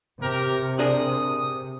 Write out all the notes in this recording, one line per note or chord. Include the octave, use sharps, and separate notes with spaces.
C3 G4 A#4
D4 G#4 A#4 D#6